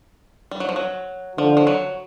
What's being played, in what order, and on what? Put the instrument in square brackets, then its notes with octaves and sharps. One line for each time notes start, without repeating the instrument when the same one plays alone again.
[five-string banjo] G3
F#3
F3
F#3
[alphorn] D3 [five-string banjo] F3
[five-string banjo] F3
F#3